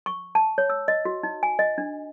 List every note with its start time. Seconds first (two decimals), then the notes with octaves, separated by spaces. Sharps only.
0.06 C#6
0.35 A5
0.58 C#5
0.70 E6
0.88 D#5
1.05 F#4
1.23 D#4
1.43 G#5
1.59 D#5
1.78 D4